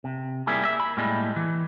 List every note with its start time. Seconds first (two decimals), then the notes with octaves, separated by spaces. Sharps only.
0.04 C3
0.47 G3 A#3 E4 G#4
0.65 E5
0.80 B5
0.97 A2 G3 G#3 A#3
1.36 E3